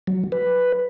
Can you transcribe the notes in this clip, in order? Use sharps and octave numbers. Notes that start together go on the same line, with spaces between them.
F#3
B4